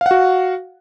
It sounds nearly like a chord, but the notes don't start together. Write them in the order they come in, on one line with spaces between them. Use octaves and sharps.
F5 F#5 F#4